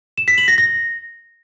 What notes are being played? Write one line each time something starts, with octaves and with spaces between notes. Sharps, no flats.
E7
B6
F#7
A#6
A#6